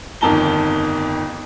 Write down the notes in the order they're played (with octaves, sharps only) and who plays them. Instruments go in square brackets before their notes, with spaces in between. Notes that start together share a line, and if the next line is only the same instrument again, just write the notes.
[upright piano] G1 F2 D#3 A5 A#5 G7